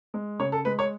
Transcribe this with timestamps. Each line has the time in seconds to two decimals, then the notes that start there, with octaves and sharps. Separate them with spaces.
0.14 G#3
0.39 C#3 C#5
0.52 A4
0.65 G#3 B4
0.79 C#5